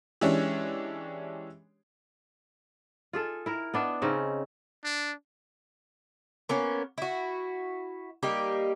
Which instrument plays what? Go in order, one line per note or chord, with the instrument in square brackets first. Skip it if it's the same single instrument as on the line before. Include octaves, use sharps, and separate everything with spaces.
[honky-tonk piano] E3 G#3 C#4 D4 G4 C#5
[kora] F4 G#4 A4
E4 A#4
B3 D4 E5
C#3 C4 C#4 D#4
[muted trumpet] D4
[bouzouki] A#3 B3 C#4
E4 F#4
G3 A#3 D#4 G4